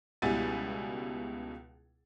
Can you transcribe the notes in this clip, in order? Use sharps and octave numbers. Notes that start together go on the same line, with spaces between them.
C#2 B2 G3 E4 G#5 A6